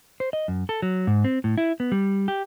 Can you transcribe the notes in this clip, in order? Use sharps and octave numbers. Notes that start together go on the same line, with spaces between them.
C5
D#5
F#2
A4
F#3
G#2
C4
A2
E4
B3
G3
G4